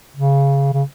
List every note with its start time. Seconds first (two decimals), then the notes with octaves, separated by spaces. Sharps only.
0.16 C#3
0.73 C#3